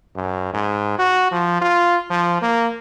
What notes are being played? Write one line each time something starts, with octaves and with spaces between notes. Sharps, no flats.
F#2
G#2
F#4
F3
F4
F3
A#3